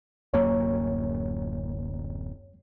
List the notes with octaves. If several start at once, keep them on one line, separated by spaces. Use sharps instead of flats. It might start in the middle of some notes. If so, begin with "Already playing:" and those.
D1 F#2 A#3 C#5